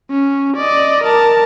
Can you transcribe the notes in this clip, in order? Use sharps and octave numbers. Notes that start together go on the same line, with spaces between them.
C#4
D5 D#5
A#4 A5